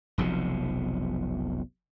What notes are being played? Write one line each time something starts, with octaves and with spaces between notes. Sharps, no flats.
F1 B1 C3 F3